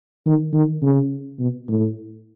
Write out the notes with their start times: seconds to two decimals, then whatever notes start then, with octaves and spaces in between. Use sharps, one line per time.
0.26 D#3
0.53 D#3
0.82 C#3
1.39 B2
1.68 A2